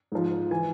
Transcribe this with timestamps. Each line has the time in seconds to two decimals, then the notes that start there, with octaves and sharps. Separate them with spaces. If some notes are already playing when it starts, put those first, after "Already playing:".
0.12 G#2 F3
0.51 E3 G#5